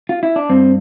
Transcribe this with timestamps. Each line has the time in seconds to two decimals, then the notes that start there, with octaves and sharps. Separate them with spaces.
0.09 F4
0.23 E4
0.36 D4
0.50 G2 C4